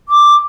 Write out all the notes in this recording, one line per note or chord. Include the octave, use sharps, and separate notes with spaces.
D6